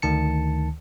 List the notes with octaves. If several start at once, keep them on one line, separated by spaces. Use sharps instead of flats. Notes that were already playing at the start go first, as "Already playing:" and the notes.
D2 D#3 A5 C#7